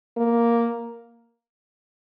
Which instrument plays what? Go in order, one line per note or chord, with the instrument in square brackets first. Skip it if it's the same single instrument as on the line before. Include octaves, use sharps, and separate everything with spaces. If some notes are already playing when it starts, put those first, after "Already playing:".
[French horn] A#3